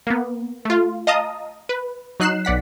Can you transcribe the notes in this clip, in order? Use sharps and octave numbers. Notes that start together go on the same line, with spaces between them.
A#3 B3
A3 F4
D#5 F5 A5 A#5 D#6
B4
F#3 D#4 F#6 C7 E7
B1 D5 F#5 B6